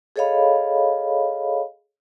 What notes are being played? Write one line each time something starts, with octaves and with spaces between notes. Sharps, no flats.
G#4 A4 C#5 D#5 F5 B5